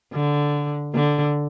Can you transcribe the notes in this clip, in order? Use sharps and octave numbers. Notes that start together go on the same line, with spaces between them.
D3
D3